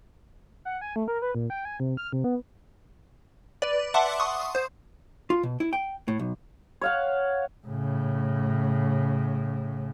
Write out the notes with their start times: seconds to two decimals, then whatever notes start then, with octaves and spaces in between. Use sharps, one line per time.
0.65 F#5
0.81 G#5
0.96 A3
1.08 A#4
1.22 B4
1.35 A#2
1.50 G5
1.65 G#5
1.80 C3
1.97 F6
2.13 C3
2.24 B3
3.62 B4 D5
3.94 E5 F#5 A5 C6 D6
4.20 C6 C#6 D#6
4.55 C5
5.30 F4
5.43 B2
5.60 E4
5.73 G5
6.08 A2
6.19 B1
6.81 C#5 F5 F#5
7.67 A2 C#3